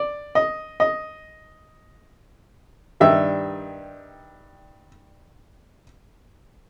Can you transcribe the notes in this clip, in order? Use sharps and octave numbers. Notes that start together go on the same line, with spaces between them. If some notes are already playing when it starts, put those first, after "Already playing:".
Already playing: D5
D#5
D#5
G2 D#3 G3 E5